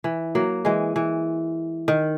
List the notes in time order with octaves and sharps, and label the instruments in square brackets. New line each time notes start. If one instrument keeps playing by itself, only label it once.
[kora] E3
F#3 A#3
E3 G#3
E3
D#3